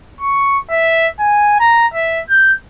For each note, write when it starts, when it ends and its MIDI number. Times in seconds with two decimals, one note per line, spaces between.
0.21 0.58 85
0.70 1.07 76
1.20 1.55 80
1.60 1.87 82
1.94 2.20 76
2.29 2.53 91